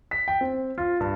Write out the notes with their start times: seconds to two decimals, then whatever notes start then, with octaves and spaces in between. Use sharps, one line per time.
0.11 B6
0.28 G5
0.41 C4
0.78 F4
1.00 G2